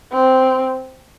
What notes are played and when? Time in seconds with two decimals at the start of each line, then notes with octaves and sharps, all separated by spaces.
0.13 C4